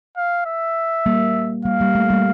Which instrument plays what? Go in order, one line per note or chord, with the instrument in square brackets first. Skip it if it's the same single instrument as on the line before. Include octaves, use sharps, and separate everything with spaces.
[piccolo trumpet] F5
E5
[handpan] G3 A#3
[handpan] G3 A#3 [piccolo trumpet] F5
[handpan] G3 A#3
A3
G3 A#3